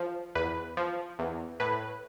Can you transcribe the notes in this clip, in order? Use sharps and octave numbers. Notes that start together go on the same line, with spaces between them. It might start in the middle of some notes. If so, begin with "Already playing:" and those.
Already playing: F3
E2 B4
F3
E2
A2 B4